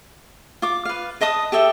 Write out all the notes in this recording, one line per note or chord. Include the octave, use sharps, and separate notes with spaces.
F4 D6
B4 F5
B4 D#5 A5 D#6
G4 A4 E5 G5